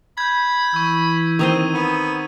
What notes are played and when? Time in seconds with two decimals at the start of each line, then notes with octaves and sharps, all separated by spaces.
0.18 B5 G6 G#6
0.74 E3 C#6 E6
1.39 D#3 C4 C5 C#6 D#6 D#7
1.74 B3